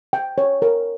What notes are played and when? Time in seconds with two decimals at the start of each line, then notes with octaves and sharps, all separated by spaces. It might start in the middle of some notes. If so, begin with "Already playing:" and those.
0.13 G5
0.38 C#5
0.62 A#4